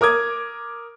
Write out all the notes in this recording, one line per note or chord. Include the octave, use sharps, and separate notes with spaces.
A#4 D6 D#6 G#6